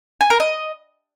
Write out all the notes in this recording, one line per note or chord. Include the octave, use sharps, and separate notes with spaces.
G#5
A#4
D#5